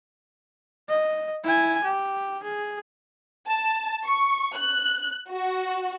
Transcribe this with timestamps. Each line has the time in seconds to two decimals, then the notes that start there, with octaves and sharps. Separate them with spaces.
0.89 D#5
1.44 E4 G#5
1.84 G4
2.44 G#4
3.48 A5
4.08 C#6
4.55 F#6
5.30 F#4